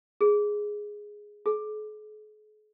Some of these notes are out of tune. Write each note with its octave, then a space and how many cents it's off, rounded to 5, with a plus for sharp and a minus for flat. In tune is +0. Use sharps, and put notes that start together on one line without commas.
G#4 +0
G#4 +45